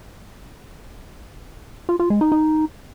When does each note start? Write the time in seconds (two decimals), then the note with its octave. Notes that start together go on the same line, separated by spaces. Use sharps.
1.89 F4
1.99 F4
2.10 G#3
2.21 D#4
2.32 D#4